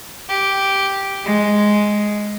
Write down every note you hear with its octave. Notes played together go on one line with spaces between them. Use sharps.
G4
G#3